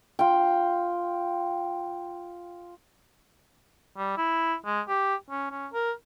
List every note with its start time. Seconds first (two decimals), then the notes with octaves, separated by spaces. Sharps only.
0.19 F4 G5
3.97 G3
4.17 E4
4.66 G#3
4.88 G4
5.30 C#4
5.51 C#4
5.73 A#4